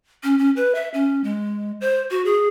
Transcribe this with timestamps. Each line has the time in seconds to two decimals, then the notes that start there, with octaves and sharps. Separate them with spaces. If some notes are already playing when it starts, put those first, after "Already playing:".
0.23 C#4
0.38 C#4
0.56 B4
0.75 E5
0.94 C#4
1.24 G#3
1.81 C5
2.11 F#4
2.25 G#4